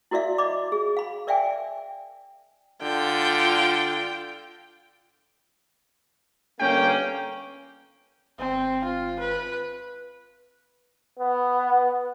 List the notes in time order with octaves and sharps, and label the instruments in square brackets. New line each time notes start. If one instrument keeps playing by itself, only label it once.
[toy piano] E4 F#4 A#4 D5 E5 F5
D5 D#5 B5 D6
G#4
F5 B5
A#4 D5 E5 F5 G5 G#5
[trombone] D3 [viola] F4 G5
[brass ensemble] G1 A#3 G5 [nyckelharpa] C#4
[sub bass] G#1 [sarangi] C4
[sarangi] F4
B4
[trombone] B3